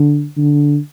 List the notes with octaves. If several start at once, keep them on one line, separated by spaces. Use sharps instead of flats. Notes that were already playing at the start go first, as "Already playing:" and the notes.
Already playing: D3
D3